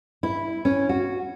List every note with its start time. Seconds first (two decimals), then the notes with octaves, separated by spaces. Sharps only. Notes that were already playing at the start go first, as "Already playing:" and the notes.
0.23 E4
0.65 C#4
0.89 F#4